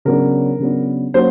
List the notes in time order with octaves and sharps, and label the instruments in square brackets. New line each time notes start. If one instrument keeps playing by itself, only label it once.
[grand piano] C#3 F#3 B3 D4 A#4
C#3 F#3 B3 D4
F#3 A#3 C#4 C5